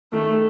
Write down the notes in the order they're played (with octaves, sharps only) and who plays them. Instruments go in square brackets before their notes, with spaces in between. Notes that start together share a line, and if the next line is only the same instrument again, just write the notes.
[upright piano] D#3 [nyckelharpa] A3